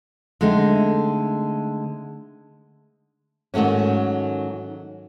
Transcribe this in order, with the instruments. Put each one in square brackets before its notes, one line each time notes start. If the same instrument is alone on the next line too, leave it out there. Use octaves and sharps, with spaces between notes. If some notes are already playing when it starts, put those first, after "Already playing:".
[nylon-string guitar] D3 G#3 A3 C4 D#4
G#2 D#3 F#3 A3 C#4